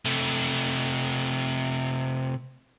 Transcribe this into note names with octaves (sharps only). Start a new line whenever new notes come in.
C3 A3